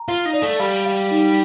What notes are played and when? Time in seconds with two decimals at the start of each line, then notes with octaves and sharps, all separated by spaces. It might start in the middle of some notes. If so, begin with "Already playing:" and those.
Already playing: A#5
0.08 F4 F5
0.26 D#4
0.33 D5
0.42 A3
0.59 G3 F5
0.86 F5
1.11 D#4